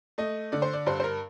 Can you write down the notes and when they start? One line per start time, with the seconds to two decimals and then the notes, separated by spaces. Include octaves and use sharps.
0.18 A3 D#5
0.52 D3 D5
0.62 C5
0.73 D5
0.86 G2 C5
1.00 C5
1.04 A#4